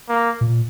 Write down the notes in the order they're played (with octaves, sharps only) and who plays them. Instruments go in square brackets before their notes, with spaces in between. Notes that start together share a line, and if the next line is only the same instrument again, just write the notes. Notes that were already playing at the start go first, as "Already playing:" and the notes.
[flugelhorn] A#3
[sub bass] A#2